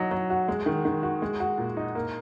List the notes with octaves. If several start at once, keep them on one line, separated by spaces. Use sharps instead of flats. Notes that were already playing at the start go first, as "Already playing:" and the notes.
Already playing: F#3 D#4
F#3
F#4
G#3
D#3
D#3
F#4
G#3
F#4
A#2
D#4
A#3